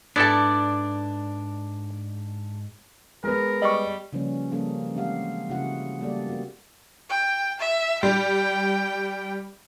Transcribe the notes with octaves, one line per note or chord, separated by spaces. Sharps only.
G#2 B3 D4 E4 A4 D5 A5
G#3 B3 A#4
G3 D#5 C#6
C#3 F3 G3 A#3 C#4 B4
F3 G3 A#3 C#4 G#4 A4
E3 G#3 C4 G4 F5 F#5
C#3 E4 F#4 G#4 F#5
G3 A#3 B3 G4 A4 D5
B3 C4 F#4 G4 A#4
G5
E5
G3 G5